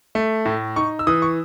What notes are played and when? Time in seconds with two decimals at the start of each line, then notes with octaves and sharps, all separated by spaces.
0.15 A3
0.45 A2
0.76 D#4 C#6
0.99 E6
1.07 E3 D#6
1.22 C#6